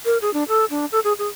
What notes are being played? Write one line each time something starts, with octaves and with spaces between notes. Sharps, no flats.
A#4
G#4
D4
A4
D4
A4
G#4
G#4